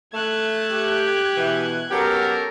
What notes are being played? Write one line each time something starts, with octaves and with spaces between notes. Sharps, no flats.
A3 F#6 G#6
G4
B2 E3
F#3 B3 C#4 G4 A4 A#4